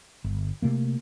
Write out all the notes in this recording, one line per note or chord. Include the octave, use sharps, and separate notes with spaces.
G1
C3 A3 A#3